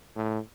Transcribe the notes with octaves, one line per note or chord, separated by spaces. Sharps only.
A2